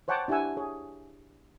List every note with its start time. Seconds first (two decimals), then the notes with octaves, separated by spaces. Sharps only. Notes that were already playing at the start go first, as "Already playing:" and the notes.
0.08 C5 C#5 F#5 G5 A5 D6
0.28 D4 E4 G4 F#5 G#5 E6
0.57 G#4 C#5